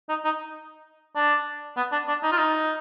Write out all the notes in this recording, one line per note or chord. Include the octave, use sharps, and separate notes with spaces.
D#4
D#4
D4
B3
D4
D4
D#4
F4
D#4